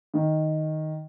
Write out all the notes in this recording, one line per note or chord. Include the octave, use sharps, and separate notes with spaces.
D#3